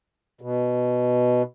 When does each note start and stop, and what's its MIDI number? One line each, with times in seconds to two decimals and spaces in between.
0.41 1.42 47